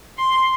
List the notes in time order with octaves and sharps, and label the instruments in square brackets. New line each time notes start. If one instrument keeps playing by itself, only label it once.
[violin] C6